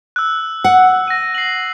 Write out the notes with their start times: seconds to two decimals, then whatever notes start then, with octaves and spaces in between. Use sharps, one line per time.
0.16 E6 F#6
0.64 F#5
1.08 A#6 D#7
1.35 C7 F#7